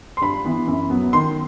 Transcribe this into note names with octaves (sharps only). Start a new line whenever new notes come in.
C6
G2 B5
E3 B3
F#2
F#3 B3
D#3 C6